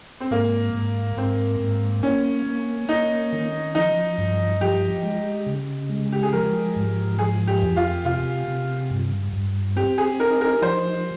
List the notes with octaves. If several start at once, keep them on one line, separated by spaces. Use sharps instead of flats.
C4
G#2 A#3
G#2
G#2 C4
G#2
A#3 C#4
A#3
A#3 D#4
D#3
F3 D#4
G2
F3 G4
G#3
C#3
G#3
G4
G#4
F3 A#4
G#2
F3 G#4
G4
F2
F4
C3 F4
C3
G2
G2
C4 G4
G#4
D#4 A#4
A#4
F3 C5